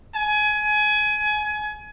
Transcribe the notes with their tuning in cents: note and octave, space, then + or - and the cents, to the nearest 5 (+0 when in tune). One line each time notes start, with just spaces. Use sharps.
G#5 +25